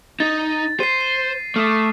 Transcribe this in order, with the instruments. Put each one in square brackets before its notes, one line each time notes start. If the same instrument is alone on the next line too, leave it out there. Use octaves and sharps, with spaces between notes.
[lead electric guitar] D#4 [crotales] A6
[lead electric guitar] C5 [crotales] C7 D#7
[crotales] C7
[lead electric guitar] A3 [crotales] D6 D#6 F6